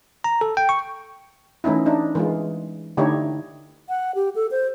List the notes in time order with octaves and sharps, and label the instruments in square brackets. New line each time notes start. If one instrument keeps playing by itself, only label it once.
[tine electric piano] A#5
A4
G5
C#6
[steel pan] E3 A3 C#4 D#4 E4
D4 D#4
E3 G#3 F4
D3 A3 D#4 E4 G4 C#5
[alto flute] F#5
G4
A4
C5